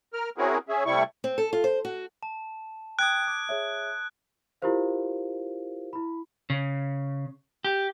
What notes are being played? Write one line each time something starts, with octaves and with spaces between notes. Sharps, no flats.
A#4 F6
C4 C#4 E4 F#4 G#4 A#4
C#4 G#4 E5
C3 G3 A3 E4 C#6
C4
A4
F4
C5
F#4
A5
G5 D#6 F#6 G#6 D7
D6
G#4 C#5 E5
E4 F4 G4 A#4 C5 F5
E4 B5
C#3
G4